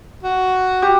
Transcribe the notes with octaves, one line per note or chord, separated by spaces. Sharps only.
F#4
G4